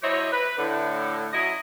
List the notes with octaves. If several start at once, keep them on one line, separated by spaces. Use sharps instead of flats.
F#3 E4 G4 C5 C#5 D#5
B4
A2 D3
F#3 C#4 E4 D#5